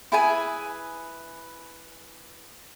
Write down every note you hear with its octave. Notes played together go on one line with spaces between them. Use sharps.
E4 G#4 B4 G#5